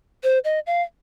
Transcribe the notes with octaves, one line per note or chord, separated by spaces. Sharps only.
C5
D#5
F5